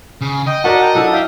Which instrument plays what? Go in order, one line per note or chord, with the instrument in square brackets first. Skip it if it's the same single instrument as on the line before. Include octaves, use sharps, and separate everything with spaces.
[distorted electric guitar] C#3
[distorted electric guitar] D#5 [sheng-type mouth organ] G5
[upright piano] F#4 A#4 D5 [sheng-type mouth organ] F#5 A5 B5
[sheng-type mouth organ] G5 A#5
[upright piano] F#3 D4 E4 [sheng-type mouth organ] A4 F#5
[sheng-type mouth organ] E5 F5 G5